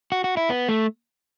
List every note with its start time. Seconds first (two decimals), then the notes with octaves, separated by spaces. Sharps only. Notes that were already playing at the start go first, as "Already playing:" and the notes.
0.12 F#4
0.24 F#4
0.37 E4
0.50 B3
0.68 A3